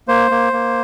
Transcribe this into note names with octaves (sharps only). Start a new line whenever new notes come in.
A#3 C5
A#3
A#3